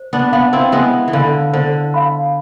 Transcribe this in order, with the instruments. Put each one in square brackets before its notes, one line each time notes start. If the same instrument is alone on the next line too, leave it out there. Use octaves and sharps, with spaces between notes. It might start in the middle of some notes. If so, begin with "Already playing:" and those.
Already playing: [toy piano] C5
[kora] B3 D4
[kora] B3 D4 [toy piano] F5 G#5 B5
[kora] C4 E4
[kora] G#3 B3 [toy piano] C5
[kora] E3
[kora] D3 [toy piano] F5 G#5 B5
[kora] D3 [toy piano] C5
[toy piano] F5 G#5 B5